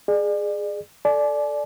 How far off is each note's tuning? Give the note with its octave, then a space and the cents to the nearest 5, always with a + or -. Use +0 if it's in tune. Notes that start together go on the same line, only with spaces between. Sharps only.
G#4 +0 D5 +35
A4 +0 D5 +0 G#5 +45